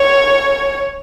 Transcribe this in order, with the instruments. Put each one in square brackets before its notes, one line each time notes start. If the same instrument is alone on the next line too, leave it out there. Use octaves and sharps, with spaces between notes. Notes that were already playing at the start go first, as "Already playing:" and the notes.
Already playing: [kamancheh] C#5